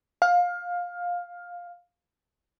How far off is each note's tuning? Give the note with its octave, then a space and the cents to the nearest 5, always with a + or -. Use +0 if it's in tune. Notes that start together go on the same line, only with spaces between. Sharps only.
F5 +15